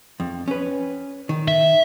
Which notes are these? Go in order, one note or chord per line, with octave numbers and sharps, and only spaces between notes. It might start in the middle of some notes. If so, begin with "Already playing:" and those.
F2
C#4 B4
D#3
E5